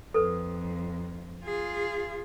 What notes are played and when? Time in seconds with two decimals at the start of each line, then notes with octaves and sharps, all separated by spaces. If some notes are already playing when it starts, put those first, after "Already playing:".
0.14 F2 A4 B4
1.44 F4 G#4